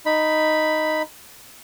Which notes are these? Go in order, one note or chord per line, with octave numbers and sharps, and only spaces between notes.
D#4 B5